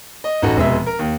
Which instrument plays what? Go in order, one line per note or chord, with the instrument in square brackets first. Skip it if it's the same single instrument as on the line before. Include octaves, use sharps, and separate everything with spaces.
[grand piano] D#5
A1 D#4 F#4 A4
F1 B2 G#3 E5
A#4
D#2